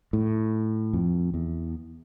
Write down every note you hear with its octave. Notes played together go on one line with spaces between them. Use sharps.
A2
F2
E2